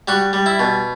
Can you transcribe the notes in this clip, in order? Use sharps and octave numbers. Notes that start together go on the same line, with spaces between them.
G3 F#4
G3
E4
B2